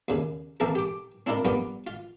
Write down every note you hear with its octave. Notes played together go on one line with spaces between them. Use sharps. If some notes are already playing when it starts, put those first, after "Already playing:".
D#2 C#3
E3 A#3 C4 A4 A#4
G4 D6
C4 D4 E4 F4 A#4
A#1 G2 G3 B3 F4 D6
F4